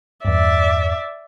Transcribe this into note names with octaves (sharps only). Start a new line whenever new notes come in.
E2 G2 D5 E5